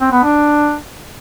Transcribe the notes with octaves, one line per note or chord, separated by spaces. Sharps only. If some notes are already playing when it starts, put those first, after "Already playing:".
C4
B3
D4